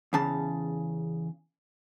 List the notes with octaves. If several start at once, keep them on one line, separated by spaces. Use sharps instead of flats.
E2 C#3 A5